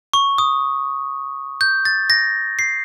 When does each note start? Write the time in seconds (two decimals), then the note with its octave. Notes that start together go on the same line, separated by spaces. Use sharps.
0.14 C#6
0.38 D#6
1.61 G6
1.85 A6
2.10 A#6
2.59 C7